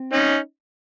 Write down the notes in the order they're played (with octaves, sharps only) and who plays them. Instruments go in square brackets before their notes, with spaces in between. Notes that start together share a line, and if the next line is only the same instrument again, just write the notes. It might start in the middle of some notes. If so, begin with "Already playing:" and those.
Already playing: [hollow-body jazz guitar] C4
[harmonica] C#4 D#4